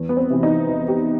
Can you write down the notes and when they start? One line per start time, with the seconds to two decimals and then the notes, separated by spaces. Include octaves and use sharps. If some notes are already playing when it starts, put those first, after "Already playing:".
Already playing: E2
0.09 B3
0.17 C4
0.30 C3 E3
0.43 D#4
0.68 E2
0.88 G4